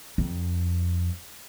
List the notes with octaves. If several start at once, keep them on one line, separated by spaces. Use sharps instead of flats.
F2